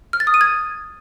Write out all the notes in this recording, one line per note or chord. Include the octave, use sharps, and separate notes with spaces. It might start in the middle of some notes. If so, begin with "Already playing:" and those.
F6
A6
D#6
D#7
G#6